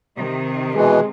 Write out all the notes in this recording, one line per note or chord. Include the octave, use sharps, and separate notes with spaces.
C3 D#3
B2 E3 G#3